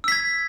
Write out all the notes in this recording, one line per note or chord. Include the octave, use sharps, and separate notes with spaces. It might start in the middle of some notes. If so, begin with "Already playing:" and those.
E6 G#6 B6